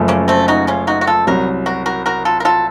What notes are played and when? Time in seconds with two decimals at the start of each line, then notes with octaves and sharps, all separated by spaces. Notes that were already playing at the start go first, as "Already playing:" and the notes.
Already playing: F#1 F#2 C#3 F3 A3
0.08 A#3 C#4
0.28 A3 C4
0.48 D#4 F#4
0.67 C#4 F4
0.87 D#4 F#4
1.01 F#4
1.07 F4 A4
1.27 C2 C3 F#3 F#4 A#4
1.66 F#4 A#4
1.86 F#4 A#4
2.06 F#4 A#4
2.25 F4 A4
2.40 A#4
2.45 F4 A4